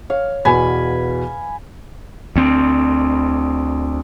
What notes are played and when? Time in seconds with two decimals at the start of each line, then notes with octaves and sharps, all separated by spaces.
0.10 C#5 F5
0.45 E2 B2 G#5 B5
2.36 D2 C4